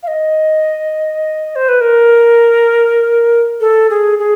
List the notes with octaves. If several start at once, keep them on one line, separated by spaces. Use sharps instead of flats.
F5
D#5
C5
B4
A#4
A4
G#4
G#4